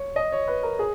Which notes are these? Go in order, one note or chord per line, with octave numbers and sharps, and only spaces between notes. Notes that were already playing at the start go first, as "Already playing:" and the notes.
Already playing: C#5
D#5
C#5
B4
A#4
G#4